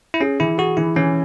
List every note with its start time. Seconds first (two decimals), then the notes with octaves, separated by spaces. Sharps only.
0.14 E4
0.21 C#4 G#4
0.40 E3 E4
0.58 F#4 G#4
0.77 E3 E4
0.96 E3 C#4